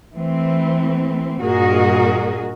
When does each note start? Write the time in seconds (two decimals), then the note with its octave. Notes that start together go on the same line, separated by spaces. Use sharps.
0.13 E3 A3 C4
1.40 G2 A#2 F#4 G#4 A#4 D#5